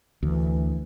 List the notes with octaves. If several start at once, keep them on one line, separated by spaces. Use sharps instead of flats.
D2 E3